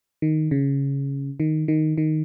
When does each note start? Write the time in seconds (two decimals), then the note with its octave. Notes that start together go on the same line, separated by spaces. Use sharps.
0.22 D#3
0.51 C#3
1.40 D#3
1.68 D#3
1.98 D#3